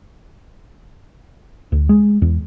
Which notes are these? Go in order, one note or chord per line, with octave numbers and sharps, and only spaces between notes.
D2
G#3
E2